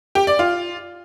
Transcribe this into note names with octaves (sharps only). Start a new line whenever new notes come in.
G4
D5
F4